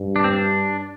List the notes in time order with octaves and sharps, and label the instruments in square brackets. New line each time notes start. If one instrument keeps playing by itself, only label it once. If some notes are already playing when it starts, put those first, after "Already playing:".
Already playing: [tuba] G2
[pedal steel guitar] D4
C4
D4